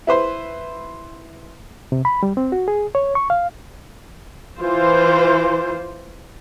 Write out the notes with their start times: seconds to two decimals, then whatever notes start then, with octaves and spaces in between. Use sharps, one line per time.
0.07 E4 B4 C5
1.92 C3
2.05 B5
2.23 G3
2.37 C4
2.52 F#4
2.68 G#4
2.95 C#5
3.15 C#6
3.30 F5
4.59 E3 F4 C5